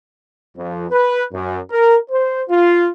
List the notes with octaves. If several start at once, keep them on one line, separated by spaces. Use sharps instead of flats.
F2
B4
F#2
A#4
C5
F4